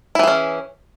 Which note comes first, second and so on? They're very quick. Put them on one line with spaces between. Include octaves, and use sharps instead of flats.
E4 E3 G#4 C#4